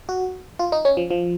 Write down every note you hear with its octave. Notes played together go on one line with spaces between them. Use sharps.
F#4
F4
D#4
C#4
F3
F3